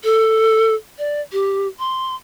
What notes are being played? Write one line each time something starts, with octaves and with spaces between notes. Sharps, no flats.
A4
D5
G4
C6